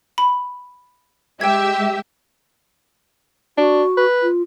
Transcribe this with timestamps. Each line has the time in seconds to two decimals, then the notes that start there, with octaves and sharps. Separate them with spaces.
0.18 B5
1.41 G#3 G4 E5 G5 G#6
3.58 D4 F#4
3.97 B4
4.22 F4